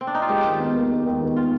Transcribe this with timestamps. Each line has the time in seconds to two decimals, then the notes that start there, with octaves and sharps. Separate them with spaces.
0.01 C4
0.07 D4
0.15 D#4
0.22 F4
0.28 G#3 G4
0.45 D#3
0.60 B3
0.75 D#2
0.91 G#3
1.06 D#3
1.22 B3
1.36 F4